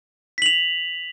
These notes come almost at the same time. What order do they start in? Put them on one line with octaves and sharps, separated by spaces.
B6 F#7 F7